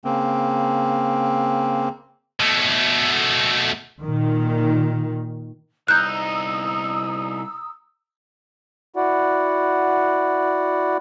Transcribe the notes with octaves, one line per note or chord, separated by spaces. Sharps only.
C#3 A#3 C4
B2 A3
A#2 D#3
C2 D#4 A#5 D#6 E6 F#6 G6
E4 F#4 D5 F#5